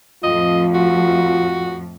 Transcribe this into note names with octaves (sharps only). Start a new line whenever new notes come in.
F2 A2 F3 F4 D#5
F#4